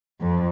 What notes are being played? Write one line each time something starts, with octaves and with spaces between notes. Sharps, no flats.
F2